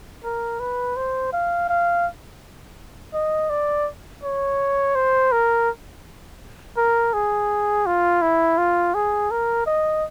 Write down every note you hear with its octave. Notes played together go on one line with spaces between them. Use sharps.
A#4
B4
C5
F5
F5
D#5
D5
C#5
C5
A#4
A#4
G#4
F4
E4
F4
G#4
A#4
D#5